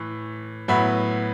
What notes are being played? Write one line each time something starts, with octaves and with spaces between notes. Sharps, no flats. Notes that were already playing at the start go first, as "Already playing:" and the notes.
Already playing: A2 E3
A2 F#3 B3 E4